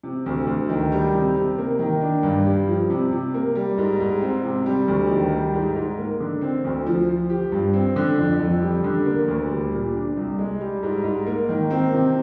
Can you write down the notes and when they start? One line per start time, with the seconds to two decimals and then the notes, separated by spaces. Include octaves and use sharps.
0.03 C3
0.26 D2
0.47 D2
0.69 D#3
0.92 G3
1.13 C3
1.35 C3
1.58 A#3
1.79 D#3
2.02 D4
2.23 G2
2.46 G3
2.67 F3
2.90 C3
3.11 C3
3.34 A#3
3.55 G3
3.78 G#2
4.00 G#2
4.22 C4
4.43 C3
4.66 G3
4.88 D2
5.10 D#3
5.32 G3
5.54 G#2
5.76 G#2
5.98 A#3
6.20 D3
6.41 C4
6.64 D2
6.86 F3
7.08 F3
7.30 G4
7.52 G2
7.73 C4
7.96 D3
8.18 F2
8.40 F2
8.62 G3
8.84 D3
9.06 A#3
9.28 D2
9.51 G3
9.72 A#2
9.94 D4
10.17 C2
10.39 G#3
10.61 G3
10.83 G#2
11.04 G#2
11.27 A#3
11.49 D#3
11.70 C4
11.92 C3